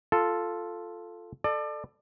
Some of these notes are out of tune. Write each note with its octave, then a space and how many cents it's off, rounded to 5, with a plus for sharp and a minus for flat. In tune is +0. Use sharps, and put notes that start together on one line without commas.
F4 +0 A4 +0
A4 +0 D5 +30